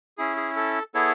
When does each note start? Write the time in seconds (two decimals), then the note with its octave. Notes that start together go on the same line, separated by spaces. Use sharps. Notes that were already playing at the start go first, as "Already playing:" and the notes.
0.18 C#4 E4 G#4
0.37 G#4
0.56 A4
0.94 B3 E4 G#4 A4 C#5